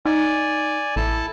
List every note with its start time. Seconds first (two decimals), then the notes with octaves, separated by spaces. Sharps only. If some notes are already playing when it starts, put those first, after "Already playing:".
0.06 D#4 D5 G#5
0.96 A1 E4 A4 A5